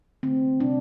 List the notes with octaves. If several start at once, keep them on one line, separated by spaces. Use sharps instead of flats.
D3 A3 C4
C3 G3 D4